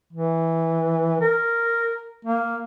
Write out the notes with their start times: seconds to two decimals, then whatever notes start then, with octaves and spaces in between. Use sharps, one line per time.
0.13 E3
1.21 A#4
2.25 A#3